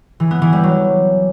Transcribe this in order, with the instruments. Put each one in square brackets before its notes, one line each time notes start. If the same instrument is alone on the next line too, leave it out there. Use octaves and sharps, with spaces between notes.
[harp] E3
B3
E3
G3
F#3